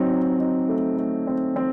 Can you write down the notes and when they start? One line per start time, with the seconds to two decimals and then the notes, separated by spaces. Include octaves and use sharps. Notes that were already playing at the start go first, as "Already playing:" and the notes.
Already playing: F#3 C4 D#4
0.10 D#4
0.40 D#4
0.69 A3
0.98 A3
1.27 C4
1.56 C4